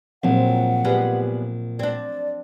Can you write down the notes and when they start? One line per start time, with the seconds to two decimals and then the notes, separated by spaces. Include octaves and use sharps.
0.24 A#1 F3 F#3 C4 F#5
0.85 G3 G#3 B3
1.79 C4 D4 D5